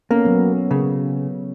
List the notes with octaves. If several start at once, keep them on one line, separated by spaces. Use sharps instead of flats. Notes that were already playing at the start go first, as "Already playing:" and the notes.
A#3 B3 C#4 A4
F#3 B3
C#3